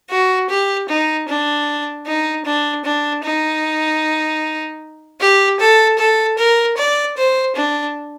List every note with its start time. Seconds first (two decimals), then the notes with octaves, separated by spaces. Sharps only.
0.11 F#4
0.50 G4
0.89 D#4
1.29 D4
2.07 D#4
2.46 D4
2.85 D4
3.24 D#4
5.21 G4
5.60 A4
5.99 A4
6.38 A#4
6.77 D5
7.17 C5
7.56 D4